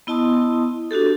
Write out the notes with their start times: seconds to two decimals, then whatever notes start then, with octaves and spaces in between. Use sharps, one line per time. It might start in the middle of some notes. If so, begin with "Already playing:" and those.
0.07 B3 E4 D#5 A5 C6 D#6
0.91 D4 F#4 G4 A4